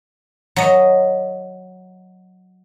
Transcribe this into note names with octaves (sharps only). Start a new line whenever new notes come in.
F#3 D#5